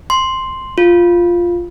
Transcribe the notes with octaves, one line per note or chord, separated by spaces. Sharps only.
C6
F4